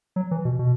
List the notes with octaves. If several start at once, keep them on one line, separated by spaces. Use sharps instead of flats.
F#3
E3
B2
B2